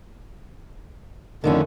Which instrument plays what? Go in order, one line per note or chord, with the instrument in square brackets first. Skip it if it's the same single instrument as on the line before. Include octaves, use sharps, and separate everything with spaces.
[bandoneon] F2 D3 [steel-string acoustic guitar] D#3 A3 C#4